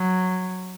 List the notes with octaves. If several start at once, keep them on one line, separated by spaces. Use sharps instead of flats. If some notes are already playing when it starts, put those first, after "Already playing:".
Already playing: F#3